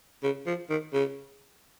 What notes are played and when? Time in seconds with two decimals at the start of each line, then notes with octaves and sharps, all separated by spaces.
0.24 C#3
0.47 F3
0.70 D#3
0.93 C#3